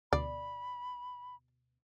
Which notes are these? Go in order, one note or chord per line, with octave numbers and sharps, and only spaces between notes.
D2 B2 D5 B5